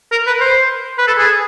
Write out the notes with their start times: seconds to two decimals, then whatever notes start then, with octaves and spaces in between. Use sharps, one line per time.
0.12 A#4
0.27 B4
0.40 C5
0.98 B4
1.07 A4
1.17 G#4